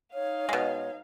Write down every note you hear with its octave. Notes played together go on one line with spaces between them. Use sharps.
D#4 C#5 F5
B2 G#3 C#5